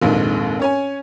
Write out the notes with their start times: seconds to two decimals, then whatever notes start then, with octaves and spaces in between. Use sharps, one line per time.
0.02 F1 A#1 D#2 G#2
0.59 C#4 C#5 G#5